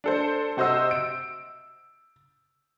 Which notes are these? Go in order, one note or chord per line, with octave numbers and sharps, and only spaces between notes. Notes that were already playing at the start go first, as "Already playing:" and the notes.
D4 A4 C5
C3 F#4 C5 D#5 E6
D7